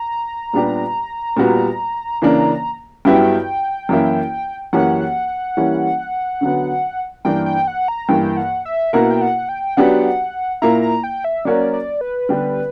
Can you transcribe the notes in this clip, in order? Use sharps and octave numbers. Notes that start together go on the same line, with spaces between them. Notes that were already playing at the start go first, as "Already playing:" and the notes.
Already playing: A#5
A#2 G3 B3 D4 G4
A#2 G3 B3 F#4
C#3 E3 A#3 D4 A#4
G2 F#3 B3 E4 G4 G5
F#2 E3 A#3 E4
F#2 E3 A#3 C#4 G4 F#5
E3 G3 A#3 C#4 E4
D3 F#3 B3
G2 E3 A#3 D4 A#4 G5
G5
F#5
A#5
G2 E3 A#3 G5
F#5
E5
B2 A#3 E4 A#4 F#5
G5
F#5
G5
F#3 B3 D4 G4 F#5
A#2 A#3 E4 A#5
A#5
G5
E5
F#3 A#3 C#4 F#4 A#4 D5
D5
B4
D3 G3 B3 D4 G4